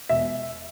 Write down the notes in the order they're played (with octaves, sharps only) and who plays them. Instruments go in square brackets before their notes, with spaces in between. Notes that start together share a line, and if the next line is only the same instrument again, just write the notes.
[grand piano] E1 E5